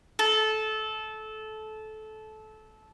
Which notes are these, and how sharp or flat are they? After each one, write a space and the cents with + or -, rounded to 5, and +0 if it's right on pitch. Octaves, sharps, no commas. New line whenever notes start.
A4 -20